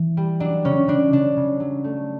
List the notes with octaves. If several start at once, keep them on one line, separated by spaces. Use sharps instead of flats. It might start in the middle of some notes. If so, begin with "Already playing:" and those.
Already playing: E3
G3
F#3 D4
C#3 C#4
C#3 D4
C#3 D4
C#3
F#3
A3